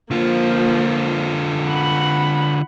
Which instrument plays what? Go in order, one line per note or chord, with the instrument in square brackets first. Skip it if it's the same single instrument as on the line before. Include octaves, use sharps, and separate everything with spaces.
[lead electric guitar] D3 F4 [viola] F3 A#3
[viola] F#5 B5